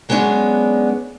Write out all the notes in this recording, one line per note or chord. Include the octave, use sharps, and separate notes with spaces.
F#3 G#3 B3 C#4 D4